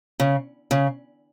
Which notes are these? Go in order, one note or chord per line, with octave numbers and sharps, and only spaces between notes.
C#3
C#3